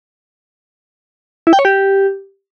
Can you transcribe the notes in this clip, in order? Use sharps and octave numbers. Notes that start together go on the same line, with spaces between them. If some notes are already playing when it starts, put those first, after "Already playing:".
E4
G5
C#5
G4